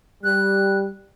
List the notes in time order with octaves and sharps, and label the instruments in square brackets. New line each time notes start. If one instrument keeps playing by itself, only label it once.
[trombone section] G3 [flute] F#6